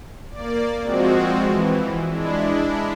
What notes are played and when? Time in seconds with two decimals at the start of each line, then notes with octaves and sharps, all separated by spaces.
0.30 A#3 D5
0.83 F3 G#3 C4 F#4
1.47 E3
2.09 G#3 D4 E4